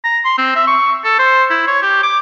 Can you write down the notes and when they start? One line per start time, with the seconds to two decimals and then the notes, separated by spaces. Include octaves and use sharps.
0.04 A#5
0.24 C6
0.38 C4
0.55 E5
0.67 C#6
1.04 A4
1.19 C5
1.50 E4
1.67 C#5
1.82 G4
2.03 D6